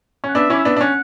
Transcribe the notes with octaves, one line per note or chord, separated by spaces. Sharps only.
C#4 F#5
B3 D4 E5
C#4 E4 D5
E5
B3 D4
D4
C#4 F#5